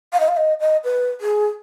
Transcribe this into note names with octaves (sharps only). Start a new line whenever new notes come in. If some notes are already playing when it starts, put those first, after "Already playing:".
F5
D#5
F5
D#5
D#5
B4
G#4